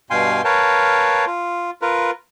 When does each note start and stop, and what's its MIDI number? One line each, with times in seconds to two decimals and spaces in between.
0.11 0.41 43
0.11 0.41 47
0.11 0.41 77
0.11 0.41 79
0.11 0.41 80
0.11 0.41 84
0.44 1.25 70
0.44 1.25 71
0.44 1.25 73
0.44 1.25 77
0.44 1.25 79
0.44 1.25 81
1.27 1.70 65
1.82 2.11 65
1.82 2.11 70
1.82 2.11 71